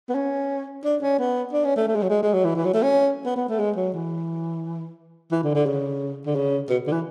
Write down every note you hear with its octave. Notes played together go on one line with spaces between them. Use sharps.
B3
C#4
D4
C#4
B3
D4
C#4
A3
A3
G#3
F#3
G#3
G#3
F#3
E3
E3
F#3
A3
C#4
B3
B3
A3
G#3
F#3
E3
E3
D3
D3
C#3
D3
C#3
B2
D3
E3